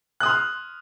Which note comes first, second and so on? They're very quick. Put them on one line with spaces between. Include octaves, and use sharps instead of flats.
F#6 D#6 C6 F6